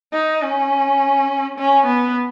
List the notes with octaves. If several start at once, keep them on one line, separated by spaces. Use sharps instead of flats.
D#4
C#4
C#4
B3